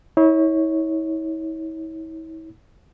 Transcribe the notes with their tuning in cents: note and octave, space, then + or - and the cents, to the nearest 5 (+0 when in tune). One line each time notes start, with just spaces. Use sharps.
E4 -40 C#5 +0